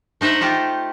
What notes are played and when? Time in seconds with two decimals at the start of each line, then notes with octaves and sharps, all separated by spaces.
0.21 A3 D#4 C5 E5 F#5
0.41 D#4 F4 G4 A4